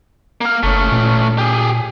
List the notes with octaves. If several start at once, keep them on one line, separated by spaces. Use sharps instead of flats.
A#3 F5
F#1 A3 C#4
A#2
G4 G#4